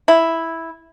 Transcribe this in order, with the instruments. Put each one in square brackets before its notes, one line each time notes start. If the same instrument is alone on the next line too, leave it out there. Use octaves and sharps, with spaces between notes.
[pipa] E4